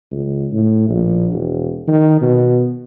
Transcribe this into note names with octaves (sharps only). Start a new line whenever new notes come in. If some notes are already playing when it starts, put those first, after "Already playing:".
C#2
A2
A#1
E1
D#3
B2